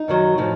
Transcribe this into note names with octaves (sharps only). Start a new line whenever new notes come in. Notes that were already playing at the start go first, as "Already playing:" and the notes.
Already playing: D#4
F#2 D#3 F#3
A2 F3